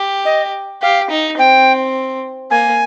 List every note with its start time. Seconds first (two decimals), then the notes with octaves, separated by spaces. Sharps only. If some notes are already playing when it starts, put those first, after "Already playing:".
Already playing: G4
0.25 D#5
0.82 G4 F5
1.10 D#4
1.39 C4 G5
2.51 A#3 G#5